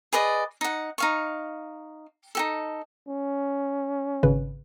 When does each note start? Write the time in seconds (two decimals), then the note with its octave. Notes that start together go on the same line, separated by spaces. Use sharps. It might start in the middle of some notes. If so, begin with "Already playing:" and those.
0.13 G#4 B4 D5 D#5
0.61 D#4 F#5
0.98 D#4 F5 C#6
2.35 D#4 G4 A4
3.08 C#4
4.23 G#1 C#3 B4